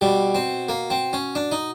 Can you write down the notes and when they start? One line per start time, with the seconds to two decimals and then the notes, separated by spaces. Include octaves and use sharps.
0.01 B2 G3
0.35 C4
0.69 A#3
0.90 C4
1.13 C#4
1.35 D4
1.52 D#4